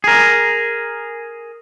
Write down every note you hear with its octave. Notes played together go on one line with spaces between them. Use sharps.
G#4 A#4